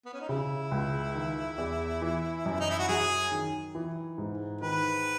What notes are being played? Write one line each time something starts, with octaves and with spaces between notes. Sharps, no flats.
B3
C#4
D#4
C#3 E4
C#2
D#3
E2
E3
F#2
D#4
E4
F#4
F#3 G#4
D#3
E3
G#2
D#3 B4